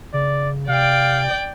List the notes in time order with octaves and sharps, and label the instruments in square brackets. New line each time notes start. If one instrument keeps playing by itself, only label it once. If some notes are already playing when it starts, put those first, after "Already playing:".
[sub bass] C#3 [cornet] D5
[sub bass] C3 [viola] D5 G5 [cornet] F5